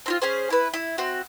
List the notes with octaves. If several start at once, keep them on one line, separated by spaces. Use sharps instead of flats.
C4 E4 F4
C#4 G#4 C5
E4 B4
E4
C4 F#4